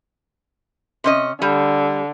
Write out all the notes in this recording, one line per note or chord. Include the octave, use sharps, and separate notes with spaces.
C3 C#4 D#5
D3 G3